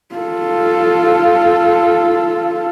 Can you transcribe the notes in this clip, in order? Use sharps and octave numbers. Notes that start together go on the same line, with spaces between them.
F4 A4